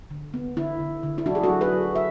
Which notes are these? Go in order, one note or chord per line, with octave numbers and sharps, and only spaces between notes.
D3
B3
D3 E4
D3
D3
E4
F#3 D4 F#4
G#4
F#4 A4
F#3
G#4 B4
F#3
E5